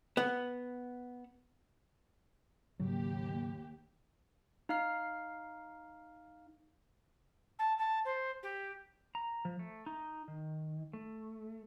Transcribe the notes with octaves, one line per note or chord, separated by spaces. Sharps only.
B3
D#2 G#2 C#3 F#3 G4
D#4 F5 F6 C7
A5
A5
C5
G4
A#5
F3
A3
D#4
D#3
A3